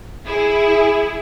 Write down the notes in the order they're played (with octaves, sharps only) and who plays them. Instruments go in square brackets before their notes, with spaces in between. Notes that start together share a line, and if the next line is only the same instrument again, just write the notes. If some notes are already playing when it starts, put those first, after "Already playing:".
[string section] E4 G#4